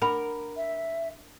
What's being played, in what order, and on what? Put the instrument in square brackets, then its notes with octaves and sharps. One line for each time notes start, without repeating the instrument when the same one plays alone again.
[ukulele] D4 F#5 B5 [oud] A#4
[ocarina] E5